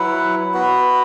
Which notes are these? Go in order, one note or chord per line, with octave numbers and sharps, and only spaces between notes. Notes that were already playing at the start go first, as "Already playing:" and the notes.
Already playing: F#3 E4 B4 F#5
B3 F#4 B4